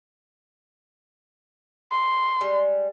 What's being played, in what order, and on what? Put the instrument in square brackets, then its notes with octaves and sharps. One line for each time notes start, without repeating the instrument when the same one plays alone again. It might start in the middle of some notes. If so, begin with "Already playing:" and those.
[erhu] C6
[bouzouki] G3 G#3